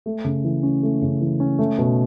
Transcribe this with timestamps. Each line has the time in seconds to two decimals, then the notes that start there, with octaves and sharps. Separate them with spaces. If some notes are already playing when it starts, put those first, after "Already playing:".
0.06 A3
0.25 C#3
0.44 E3
0.63 C#4
0.83 A3
1.02 C#3
1.21 E3
1.40 C#4
1.59 A3
1.78 B2